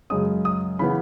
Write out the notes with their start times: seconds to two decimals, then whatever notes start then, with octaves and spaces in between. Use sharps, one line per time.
0.10 F#2 C#3 G#3 C#4 D#6
0.45 D#6
0.79 C#3 E3 B3 B5